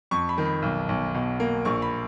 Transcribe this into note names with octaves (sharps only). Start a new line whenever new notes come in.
F2 C#6
B5
D#3
B5
B1
B1
B2
A#3
A#1 C#6
B5